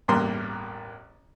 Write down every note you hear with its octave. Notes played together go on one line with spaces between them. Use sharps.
A1 E2 G2 A#3 C6